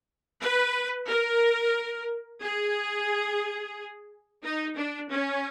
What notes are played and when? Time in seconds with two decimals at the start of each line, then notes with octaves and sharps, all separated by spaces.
0.40 B4
1.07 A#4
2.41 G#4
4.42 D#4
4.76 D4
5.10 C#4